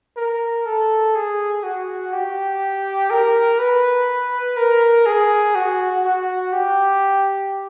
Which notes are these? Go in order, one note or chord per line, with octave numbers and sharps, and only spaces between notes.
A#4
A4
G#4
F#4
G4
A#4
B4
A#4
G#4
F#4
F#4
G4